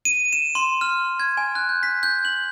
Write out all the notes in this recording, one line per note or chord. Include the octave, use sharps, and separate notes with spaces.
D#7
E7
C6
F6
G#6
G#5
F#6
G6
B6
G6
F#7